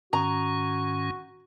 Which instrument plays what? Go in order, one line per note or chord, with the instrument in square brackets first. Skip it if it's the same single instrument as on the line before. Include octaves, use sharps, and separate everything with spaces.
[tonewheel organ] G#2 D#3 C#4 [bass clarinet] F#4 [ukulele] A#5